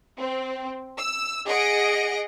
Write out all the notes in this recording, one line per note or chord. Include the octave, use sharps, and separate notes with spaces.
C4
E6
G#4 D#5 F#5 A#6 C#7 D7